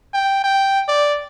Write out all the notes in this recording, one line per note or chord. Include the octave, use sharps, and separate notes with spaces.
G5
G5
D5